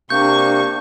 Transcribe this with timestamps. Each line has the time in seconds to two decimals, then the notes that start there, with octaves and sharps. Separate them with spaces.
0.10 C3 A#3 D4 C#6 G6